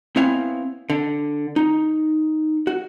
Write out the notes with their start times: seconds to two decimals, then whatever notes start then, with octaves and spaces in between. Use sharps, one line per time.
0.16 B3 C4 E4 C#5 F5 G#5
0.90 D3
1.56 D#4
2.67 F#4